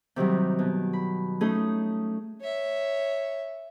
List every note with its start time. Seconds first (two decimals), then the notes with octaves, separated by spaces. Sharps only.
0.16 C3 D#3 F#3 G3
0.59 B2
0.93 B5
1.41 A3 C#4 D#4 G#4
2.40 C#5 E5